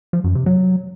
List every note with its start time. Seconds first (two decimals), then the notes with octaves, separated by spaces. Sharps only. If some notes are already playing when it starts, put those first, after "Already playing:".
0.13 F3
0.24 F#2
0.35 C3
0.46 F#3